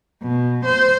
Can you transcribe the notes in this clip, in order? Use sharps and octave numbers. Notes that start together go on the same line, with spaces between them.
B2
C5